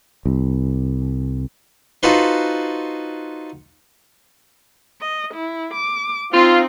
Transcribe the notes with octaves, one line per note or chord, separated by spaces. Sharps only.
C2
D#4 F4 F#4 A4 B4 C5
D#5
E4
D6
C4 D#4 F4